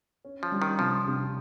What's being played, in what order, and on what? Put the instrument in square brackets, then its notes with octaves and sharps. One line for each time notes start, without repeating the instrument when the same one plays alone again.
[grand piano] C#4
[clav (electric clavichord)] F3
[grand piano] G3
[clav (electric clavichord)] D#3
[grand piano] C3 [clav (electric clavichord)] F3
[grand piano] C3